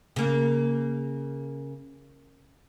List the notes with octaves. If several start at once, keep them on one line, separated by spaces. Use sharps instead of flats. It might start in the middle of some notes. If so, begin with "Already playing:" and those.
C#3 A#3